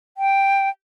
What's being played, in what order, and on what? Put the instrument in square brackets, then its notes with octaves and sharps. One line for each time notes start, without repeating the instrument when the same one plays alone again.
[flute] G5